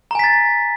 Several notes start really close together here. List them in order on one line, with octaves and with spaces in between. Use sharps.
A#5 G#5 B6 A6